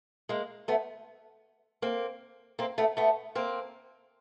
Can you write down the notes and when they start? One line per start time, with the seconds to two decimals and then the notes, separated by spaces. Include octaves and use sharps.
0.29 G#3 A#3
0.68 A3 B3
1.82 A#3 C4
2.59 A#3 C4
2.78 A3 B3
2.97 A3 B3
3.35 A#3 C4